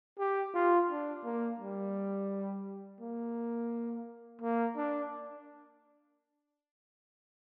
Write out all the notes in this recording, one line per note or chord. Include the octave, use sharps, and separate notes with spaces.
G4
F4
D4
A#3
G3
A#3
A#3
D4